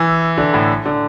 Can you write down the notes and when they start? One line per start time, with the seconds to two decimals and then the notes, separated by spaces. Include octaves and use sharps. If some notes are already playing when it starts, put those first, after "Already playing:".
Already playing: E3
0.38 D3
0.54 A2
0.86 D3